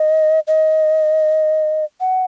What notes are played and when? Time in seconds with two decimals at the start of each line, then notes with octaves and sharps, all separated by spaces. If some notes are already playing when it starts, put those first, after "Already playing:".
Already playing: D#5
0.47 D#5
2.00 F#5